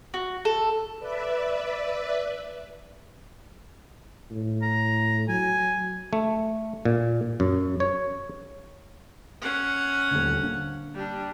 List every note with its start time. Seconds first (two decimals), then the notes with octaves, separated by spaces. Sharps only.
0.14 F#4
0.45 A4
0.99 B4 D5 E5
4.31 A2
4.62 A#5
5.29 F#3 G#5
6.13 A3
6.85 A#2
7.40 F#2
7.80 C#5
9.42 C#4 F#5
10.11 D#1 D2
10.41 D3 A#3
10.95 G3 D4